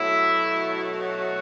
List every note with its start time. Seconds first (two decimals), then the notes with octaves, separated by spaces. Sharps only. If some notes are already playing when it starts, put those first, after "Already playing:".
Already playing: B2 F#3 A3 E4
0.99 F#4